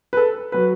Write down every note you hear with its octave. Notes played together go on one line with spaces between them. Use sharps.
B4
A4
F#3 B4